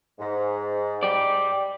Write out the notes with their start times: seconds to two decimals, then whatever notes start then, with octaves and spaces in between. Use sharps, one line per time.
0.19 G#2
1.03 G4 D5